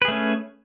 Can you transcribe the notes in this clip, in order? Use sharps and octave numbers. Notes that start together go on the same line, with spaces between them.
A3 C#4 G#4 B4